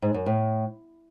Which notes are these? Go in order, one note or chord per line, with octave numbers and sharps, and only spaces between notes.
G#2
F#2
A2